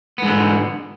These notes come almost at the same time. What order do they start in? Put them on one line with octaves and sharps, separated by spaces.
B3 G#2 D3